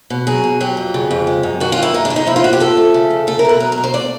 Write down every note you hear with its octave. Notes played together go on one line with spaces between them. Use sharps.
B2
F#3 G#4
B2
F#3 G4
F2
C#3
F2
G#3
F#2
D#3 F#4
F4
F#2
E4
G#3 D#4
D4
A2
D#4
F3 E4
F4
A2 F#4
G4
F3 A4
A3
C#3
F2
A3 A4
A#4
B2 B4
F#3 A#4
A#4
B2
C5
A3 D5